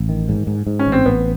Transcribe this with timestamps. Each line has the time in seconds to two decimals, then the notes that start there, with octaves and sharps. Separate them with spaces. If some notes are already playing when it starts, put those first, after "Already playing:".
Already playing: A1
0.09 D#3
0.29 G#2
0.47 G#2
0.67 G#2
0.79 C#4
0.87 A1
0.92 C4
1.06 A1 B3